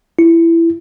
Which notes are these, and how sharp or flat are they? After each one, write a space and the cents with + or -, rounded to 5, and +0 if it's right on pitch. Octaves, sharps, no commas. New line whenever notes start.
E4 +15